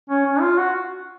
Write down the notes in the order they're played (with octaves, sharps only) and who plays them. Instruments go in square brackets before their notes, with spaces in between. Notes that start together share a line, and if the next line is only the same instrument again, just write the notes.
[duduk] C#4
C#4
F4
F#4